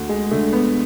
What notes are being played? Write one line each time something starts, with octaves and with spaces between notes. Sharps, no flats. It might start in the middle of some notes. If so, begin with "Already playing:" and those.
Already playing: D2
G#3
D3 A3
B3